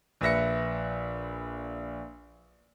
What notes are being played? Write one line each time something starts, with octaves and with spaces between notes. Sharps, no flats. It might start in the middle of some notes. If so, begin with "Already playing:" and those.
A#1 B4 E5 A#6 C#7